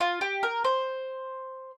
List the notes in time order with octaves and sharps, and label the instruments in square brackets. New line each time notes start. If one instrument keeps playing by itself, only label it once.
[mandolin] F4
G4
A#4
C5